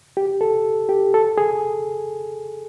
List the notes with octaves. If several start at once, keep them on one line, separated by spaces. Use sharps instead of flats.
G4
A4
G4
A4
G#4